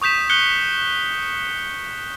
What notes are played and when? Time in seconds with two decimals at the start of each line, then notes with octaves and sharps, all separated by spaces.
0.02 C#6 D#6 G6 B6 E7
0.30 F#6 G6 C#7 G7